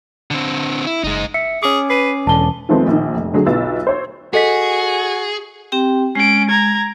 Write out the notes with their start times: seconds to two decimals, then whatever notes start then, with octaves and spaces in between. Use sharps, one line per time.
0.31 D3 C4
0.86 E4
1.04 F#1 G#3 D#4
1.34 E5 C#7
1.63 C#4 G#4 D6
1.90 B4 C7 D#7
2.27 E1 D3 A5 G7
2.69 D#3 F3 G#3 A3 B3 C4
2.88 A#1 D#3
3.15 F1
3.33 D3 F#3 G#4 A4
3.46 B1 B3 E4 F4 E6 A6
3.87 C5 C#5
4.34 F#4 G#4 A4 D#5 B6
5.72 C4 G4 G5
6.15 G#3 C#4 D7
6.50 A#5 G#6